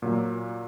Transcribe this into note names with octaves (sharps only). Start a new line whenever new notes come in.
A#2 F#3 A#3